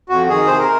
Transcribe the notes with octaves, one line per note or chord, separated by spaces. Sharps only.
F2 F#4
D#3 G#4
C3 C5
A#4